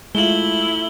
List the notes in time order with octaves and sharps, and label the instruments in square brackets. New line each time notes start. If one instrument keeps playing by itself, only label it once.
[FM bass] G#3 [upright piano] A3 F4 [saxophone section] E4 [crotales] F#7 G7